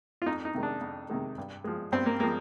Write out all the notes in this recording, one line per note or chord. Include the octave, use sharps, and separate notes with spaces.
F4
F2 D#4
D#4
C3 D#3 G#3
D4
F2
C3 D#3 G#3
G2
F3 G#3
G2 C4
A#3
F3 G#3 A#3